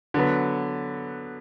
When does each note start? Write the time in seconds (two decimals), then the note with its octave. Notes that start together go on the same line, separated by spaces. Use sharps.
0.14 D3 F#3 B3